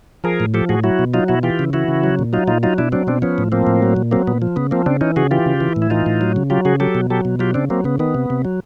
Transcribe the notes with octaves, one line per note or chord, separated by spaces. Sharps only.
F3 G#4 A#4
A2
F3 G4 A4
A2 F#4 G#4
F#3 E4 F#4
B2
F#3 D#4 F4
B2 E4 F#4
E3 F4 G4
C#3
E3 E4 F#4
C#3
F#3
A#2
F#3 D#4 F4
A#2 D#4 F4
F#3 D#4 F4
B2 D4 E4
F#3 C4 D4
B2 C4 D4
F3 B3 C#4
A2
F3 A#3 C4
A2
F#3
A#2
F#3 A#3 C4
A#2 B3
F3
C#3 B3
F3 A#3 C4
C#3 C4 D4
E3 C#4 D#4
C#3 F#4 G#4
E3 F4 G4
C#3
E3
A2
E4
E3 D#4 F4
A2
F#3
C#3
F#3 F4 G4
C#3 F#4 G#4
F#3 G4 A4
B2
F#3 G4 A4
B2
F#3 F4 G4
C#3 C4 D4
F#3 A#3 C4
C#3 B3
D#3 B3
C3
C3
F#3